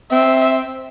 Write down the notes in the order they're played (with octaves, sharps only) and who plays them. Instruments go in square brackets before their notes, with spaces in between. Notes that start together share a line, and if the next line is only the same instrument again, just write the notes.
[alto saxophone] C4 [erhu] E5